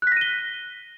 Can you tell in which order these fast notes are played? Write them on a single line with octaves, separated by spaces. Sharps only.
F#6 B6 A#6 D#7 G7